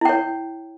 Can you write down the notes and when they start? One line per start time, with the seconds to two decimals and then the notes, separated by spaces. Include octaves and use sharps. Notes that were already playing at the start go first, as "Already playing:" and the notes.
0.01 E4
0.05 G5
0.09 C#5